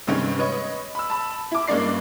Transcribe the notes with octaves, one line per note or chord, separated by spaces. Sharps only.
G2 C3 D#3 G#3 C4 C#4
B4 C#5 D#5
B5 E6
A5 B5
E4 D6
G2 G#3 A#3 C#4 D5 C7